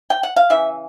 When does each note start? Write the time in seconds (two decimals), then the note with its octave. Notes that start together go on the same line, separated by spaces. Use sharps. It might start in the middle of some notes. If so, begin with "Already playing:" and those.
0.10 G5
0.23 F#5
0.36 F5
0.50 C#3 E3 E5